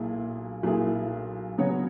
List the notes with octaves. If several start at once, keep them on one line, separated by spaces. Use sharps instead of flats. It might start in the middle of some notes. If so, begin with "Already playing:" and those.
Already playing: B1 A#2 A#3 E4 G#4
B1 A#2 A#3 E4 G#4
C#3 F#3 B3 F#4 C#5